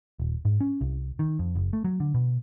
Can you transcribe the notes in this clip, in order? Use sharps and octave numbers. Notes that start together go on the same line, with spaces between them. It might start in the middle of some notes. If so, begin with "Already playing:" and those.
D#1
G#2
C#4
C2
D#3
F2
F#1
A3
F#3
D3
B2